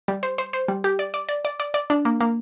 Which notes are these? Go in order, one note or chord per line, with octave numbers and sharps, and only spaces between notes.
G3
C5
C5
C5
G3
G4
D5
D5
D5
D5
D5
D5
D4
A#3
A#3